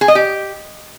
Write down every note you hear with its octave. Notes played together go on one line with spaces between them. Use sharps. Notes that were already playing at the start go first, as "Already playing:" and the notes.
G#4
D#5
G4